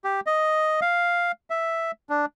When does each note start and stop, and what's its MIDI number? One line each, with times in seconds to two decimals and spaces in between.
0.04 0.20 67
0.26 0.80 75
0.81 1.32 77
1.50 1.91 76
2.09 2.26 62